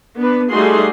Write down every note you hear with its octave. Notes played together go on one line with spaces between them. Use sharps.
B3 D4 B4
G3 A3 D#4 F#4 G#4 C6